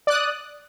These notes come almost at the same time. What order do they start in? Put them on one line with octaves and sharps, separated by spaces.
D5 F#6 D#6